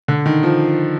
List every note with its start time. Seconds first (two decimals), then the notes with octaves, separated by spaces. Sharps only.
0.08 D3
0.26 D#3
0.43 F3